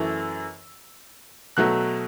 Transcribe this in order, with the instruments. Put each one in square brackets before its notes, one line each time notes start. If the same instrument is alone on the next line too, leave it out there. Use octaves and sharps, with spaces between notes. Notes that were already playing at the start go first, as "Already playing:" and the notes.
Already playing: [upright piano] F#2 E3 A3 E6
B2 F#3 A3 F#6